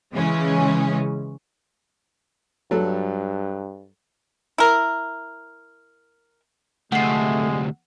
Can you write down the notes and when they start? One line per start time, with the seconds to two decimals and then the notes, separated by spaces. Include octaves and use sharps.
0.13 C#3 E3 G#3 C#4
2.71 G2 F#3 A4
4.58 E4 A#4
6.92 D2 C3 G#3 A3 F#5 C7